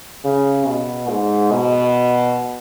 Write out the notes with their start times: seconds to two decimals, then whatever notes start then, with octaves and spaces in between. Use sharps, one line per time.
0.24 C#3
0.66 B2
1.09 G#2
1.52 B2